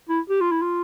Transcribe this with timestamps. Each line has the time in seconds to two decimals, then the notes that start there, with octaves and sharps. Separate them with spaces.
0.09 E4
0.30 G4
0.41 F4
0.52 E4
0.62 F4